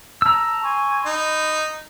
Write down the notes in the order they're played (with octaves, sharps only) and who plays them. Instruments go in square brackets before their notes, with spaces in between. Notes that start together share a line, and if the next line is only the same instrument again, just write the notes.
[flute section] A5 [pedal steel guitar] A#5 E6
[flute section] G#5 C6 C#6
[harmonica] D#4 [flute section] B5